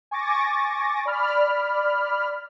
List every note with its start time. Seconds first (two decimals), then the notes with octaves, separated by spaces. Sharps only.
0.11 G#5 C#6 D6 A6 A#6
1.05 D5 B5 F6